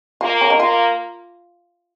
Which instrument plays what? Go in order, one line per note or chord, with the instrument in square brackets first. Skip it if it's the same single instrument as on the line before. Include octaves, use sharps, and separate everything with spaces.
[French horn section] A#3 [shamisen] F4
[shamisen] C#4
D#4
[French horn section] A#3 [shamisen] F4